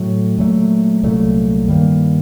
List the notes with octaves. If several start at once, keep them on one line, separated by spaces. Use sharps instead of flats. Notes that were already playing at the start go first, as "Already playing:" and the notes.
Already playing: A2 F#3 A3
A#2 F#3 A3
C2 A#2 F#3 A3
G2 D#3 G3 A#3